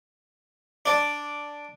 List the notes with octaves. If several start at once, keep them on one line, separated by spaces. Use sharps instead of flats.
D4 D5